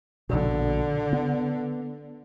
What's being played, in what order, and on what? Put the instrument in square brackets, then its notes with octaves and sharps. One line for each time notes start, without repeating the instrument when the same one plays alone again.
[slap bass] A#1 B2 [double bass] D3
[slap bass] B3